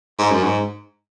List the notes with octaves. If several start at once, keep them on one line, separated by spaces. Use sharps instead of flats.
G#2
F#2
G#2